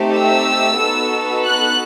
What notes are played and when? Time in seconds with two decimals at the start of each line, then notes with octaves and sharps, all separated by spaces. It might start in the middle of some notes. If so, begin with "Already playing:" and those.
Already playing: A3 C4 D#4 G4
0.17 E6
0.81 B3 D#4 F#4 A4
1.44 F#6